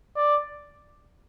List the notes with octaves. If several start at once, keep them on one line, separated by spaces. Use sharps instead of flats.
D5